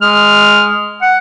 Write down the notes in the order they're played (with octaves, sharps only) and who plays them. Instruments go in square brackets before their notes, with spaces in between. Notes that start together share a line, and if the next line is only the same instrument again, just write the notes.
[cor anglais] G#3 [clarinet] F6
[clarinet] F#5